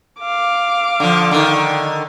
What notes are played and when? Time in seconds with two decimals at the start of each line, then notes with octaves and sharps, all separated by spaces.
0.21 F5 D6
1.00 D3 F3
1.31 D3 D#3